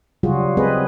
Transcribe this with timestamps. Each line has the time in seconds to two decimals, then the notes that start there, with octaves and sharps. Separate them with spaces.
0.23 C#3 F#3 G3 F4 F#4 G#4
0.57 G#3 C4 C#4 G#4 B4 D#5